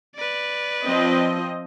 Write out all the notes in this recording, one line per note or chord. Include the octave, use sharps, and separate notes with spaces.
B4 D5
F3 C4 D#5